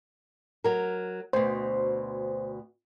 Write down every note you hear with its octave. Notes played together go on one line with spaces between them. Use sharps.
F#3 A#4
D2 B2 C5